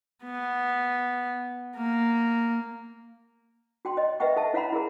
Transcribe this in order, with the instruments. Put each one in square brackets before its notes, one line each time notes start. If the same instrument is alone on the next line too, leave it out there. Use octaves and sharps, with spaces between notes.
[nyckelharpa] B3
A#3
[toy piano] F#4 G5 C6
C#5 D#5
B4 D#5 E5 F#5 G5 C#6
A4 D#5 E5 A5
E4 C#5 F5 F#5 A#5 B5
E4 G#4 A#4 A#5